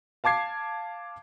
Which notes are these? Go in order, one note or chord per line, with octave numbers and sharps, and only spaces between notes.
F5 A5 D6 G#6 C7